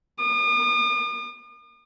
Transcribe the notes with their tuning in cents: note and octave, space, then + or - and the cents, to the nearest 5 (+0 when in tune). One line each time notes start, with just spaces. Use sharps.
D#6 -45